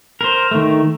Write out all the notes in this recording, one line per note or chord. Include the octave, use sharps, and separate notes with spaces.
A#4 C5
D#3 A3